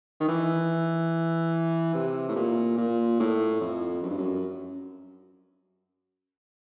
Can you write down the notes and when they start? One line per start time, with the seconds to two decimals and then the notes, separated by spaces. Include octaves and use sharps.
0.20 D#3
0.28 E3
1.94 C3
2.29 A2
2.36 A#2
2.77 A#2
3.20 A2
3.61 F2
4.03 F#2
4.09 G2
4.17 F#2